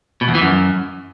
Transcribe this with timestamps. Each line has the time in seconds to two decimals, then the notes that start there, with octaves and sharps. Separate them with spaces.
0.21 B2
0.28 E2
0.35 E3
0.42 F#2